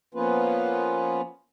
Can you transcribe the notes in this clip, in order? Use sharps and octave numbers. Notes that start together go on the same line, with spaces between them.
F3 A#3 B3 C#4 F4 B4